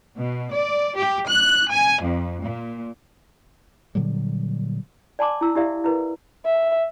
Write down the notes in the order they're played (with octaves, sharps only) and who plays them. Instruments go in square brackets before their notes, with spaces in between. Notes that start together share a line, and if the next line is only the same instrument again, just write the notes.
[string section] B2
D5
G4
F#6
G#5
F2
A#2
[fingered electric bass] A#2 D3 F#3 G3
[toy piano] D5 G#5 A5 C6 D6
E4 E6
E4 G4 D5 E5 F5
E4 A#4 B4
[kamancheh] E5